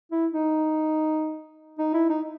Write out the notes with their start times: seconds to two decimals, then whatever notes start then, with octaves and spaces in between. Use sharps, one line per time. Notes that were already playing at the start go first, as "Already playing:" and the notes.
0.11 E4
0.33 D#4
1.79 D#4
1.94 E4
2.10 D#4